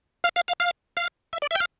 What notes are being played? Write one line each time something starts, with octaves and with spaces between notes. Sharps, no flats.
F5
F5
F5
F5
F5
E5
D5
E5
G5
F5